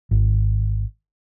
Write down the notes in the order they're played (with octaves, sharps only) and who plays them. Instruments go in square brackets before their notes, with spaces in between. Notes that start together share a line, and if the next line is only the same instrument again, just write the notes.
[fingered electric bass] G#1